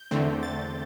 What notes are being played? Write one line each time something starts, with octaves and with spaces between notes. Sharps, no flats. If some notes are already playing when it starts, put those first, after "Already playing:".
Already playing: G6
E2 D3 A3 C4
A6